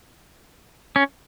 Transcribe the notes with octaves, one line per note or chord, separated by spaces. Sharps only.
C#4